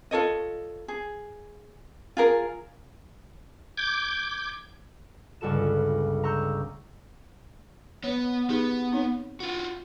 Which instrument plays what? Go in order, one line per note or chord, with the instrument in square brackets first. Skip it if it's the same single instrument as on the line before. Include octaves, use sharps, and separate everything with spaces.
[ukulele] F4 A4 C#5 D#5
G#4
F4 G#4 A#4
[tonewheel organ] D6 G6 G#6
[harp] G1 C#2 F#4 A4 E7
A#5 C#6 E6 G6
[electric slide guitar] B3 [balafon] C#5
[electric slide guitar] B3 [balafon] D#4 G4 G#4
[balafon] C4 D#4 C#5
[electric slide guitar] F4 F#4